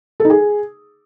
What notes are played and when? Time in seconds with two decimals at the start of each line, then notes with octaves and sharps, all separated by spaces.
0.20 A4
0.25 D#4
0.30 G#4